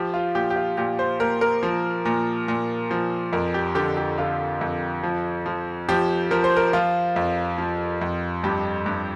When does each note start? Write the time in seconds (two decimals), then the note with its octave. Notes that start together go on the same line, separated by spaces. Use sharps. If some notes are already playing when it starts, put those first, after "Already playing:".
Already playing: F3 G4
0.14 F4
0.35 A#2 G4
0.50 G4
0.56 F4
0.77 A#2 G4
0.99 C5
1.20 A#2 A#4
1.41 A#4
1.63 F3
2.05 A#2
2.48 A#2
2.91 F3
3.33 F2 A#4
3.54 G4
3.75 D3 G4
3.97 G4
4.18 D3 F4
4.61 F2
5.03 F3
5.46 F3
5.89 F3 G4
6.31 F3 A#4
6.44 C5
6.56 A#4
6.73 F3 F4
7.16 F2
7.58 F3
8.01 F2
8.44 G2 G4
8.86 G2